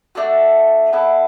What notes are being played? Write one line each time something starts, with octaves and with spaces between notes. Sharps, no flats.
A3 D4 F#4 A4
B3 E4 A4